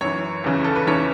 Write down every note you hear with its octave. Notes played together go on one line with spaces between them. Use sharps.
F#2 E3 C#5
E2 C#3 E3
A4
B4
E2 C#3 E3 C#5